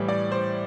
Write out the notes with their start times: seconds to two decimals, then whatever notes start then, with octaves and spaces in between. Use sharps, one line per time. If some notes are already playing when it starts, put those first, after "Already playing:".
Already playing: A2 E3 G3
0.08 D5
0.32 C5